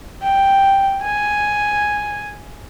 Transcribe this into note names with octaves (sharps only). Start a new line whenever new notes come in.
G5
G#5